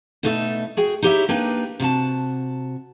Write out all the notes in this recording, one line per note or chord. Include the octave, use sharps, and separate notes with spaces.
B2 A3 D#4 A4 C#5 E5
F#4 G#4 G5
D#4 E4 G4 B4 C#5 E5
A#3 D4 D#4 B4 G5
C3 F#4 D#5 A5